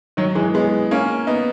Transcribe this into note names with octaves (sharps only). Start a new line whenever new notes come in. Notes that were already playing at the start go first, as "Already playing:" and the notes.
D#3 F#3
E3 G#3
G#3 B3
A#3 C#4
B3 D#4